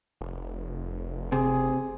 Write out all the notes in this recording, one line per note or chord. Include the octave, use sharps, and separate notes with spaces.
F1
C3 G#4